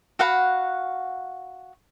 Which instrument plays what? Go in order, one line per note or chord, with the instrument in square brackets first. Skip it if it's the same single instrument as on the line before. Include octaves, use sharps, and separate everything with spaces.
[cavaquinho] F#4 F5 F#5 B5